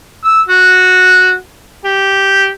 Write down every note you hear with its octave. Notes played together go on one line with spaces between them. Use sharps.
E6
F#4
G4